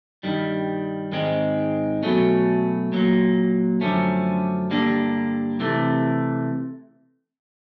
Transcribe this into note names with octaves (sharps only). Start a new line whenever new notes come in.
G2 D#3 G3
G#2 D#3 G#3 C4
B2 F#3 A3 C#4
A#2 F#3 A#3
F#2 D3 F3 A3 C#4
G2 D3 G3 A#3 D4
C3 E3 A3